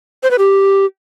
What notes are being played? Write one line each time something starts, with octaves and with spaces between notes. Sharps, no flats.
C5
B4
G4